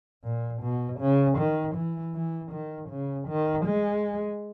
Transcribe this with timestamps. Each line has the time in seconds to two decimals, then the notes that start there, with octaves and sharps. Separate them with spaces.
0.24 A#2
0.63 B2
1.01 C#3
1.39 D#3
1.76 E3
2.15 E3
2.52 D#3
2.90 C#3
3.29 D#3
3.66 G#3